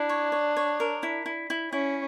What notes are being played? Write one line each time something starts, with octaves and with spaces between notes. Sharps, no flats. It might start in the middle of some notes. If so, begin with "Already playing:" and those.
Already playing: D4 E4
C#5
C#5
C#5
A#4
E4
E4
E4
C#4 E4